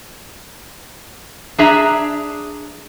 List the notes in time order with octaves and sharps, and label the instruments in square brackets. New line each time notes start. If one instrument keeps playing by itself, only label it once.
[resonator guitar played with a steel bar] D4 G#4 E5 A#5